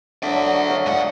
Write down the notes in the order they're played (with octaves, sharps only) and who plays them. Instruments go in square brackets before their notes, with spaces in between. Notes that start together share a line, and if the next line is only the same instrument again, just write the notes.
[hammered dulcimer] D3 F#3 [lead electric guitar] D5 E5
[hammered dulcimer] C#5 D#5
F5 G#5 A#5
[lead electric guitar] G#2 F#5